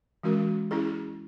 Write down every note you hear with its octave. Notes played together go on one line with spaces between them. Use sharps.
E3 G#3 C#4 F#4 A#4
C#4 E4 G#4